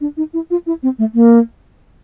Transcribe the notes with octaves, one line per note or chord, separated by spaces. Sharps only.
D4
D#4
E4
F4
E4
C4
A3
A#3